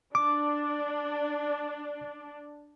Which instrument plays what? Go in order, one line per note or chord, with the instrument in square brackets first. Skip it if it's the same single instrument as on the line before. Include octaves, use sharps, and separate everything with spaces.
[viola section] D4 [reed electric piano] D6